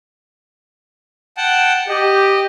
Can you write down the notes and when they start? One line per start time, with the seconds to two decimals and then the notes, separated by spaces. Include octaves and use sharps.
1.37 F#5 G5 A5
1.89 G4 D#5